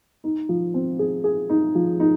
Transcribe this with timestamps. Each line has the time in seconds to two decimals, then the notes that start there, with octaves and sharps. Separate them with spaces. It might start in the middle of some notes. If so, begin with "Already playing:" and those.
0.24 D#4
0.49 F3
0.74 C4
0.99 G#4
1.24 G#4
1.49 D#4
1.75 F3
2.00 D#4